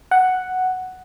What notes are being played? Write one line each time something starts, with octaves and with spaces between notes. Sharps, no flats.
F#5